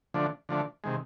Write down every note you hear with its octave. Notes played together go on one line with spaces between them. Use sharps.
D3 F3 A3 D4
D3 F3 A3 D4
C3 D#3 G#3